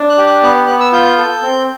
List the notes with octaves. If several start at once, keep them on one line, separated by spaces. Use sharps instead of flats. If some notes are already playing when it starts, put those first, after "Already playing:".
Already playing: D4
F#6
G4
F#6
B3 F#6
B3 F#6
E6
F4 G6
A4
C4